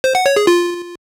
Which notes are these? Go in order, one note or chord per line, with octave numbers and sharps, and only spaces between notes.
C5
F#5
C#5
G#4
F4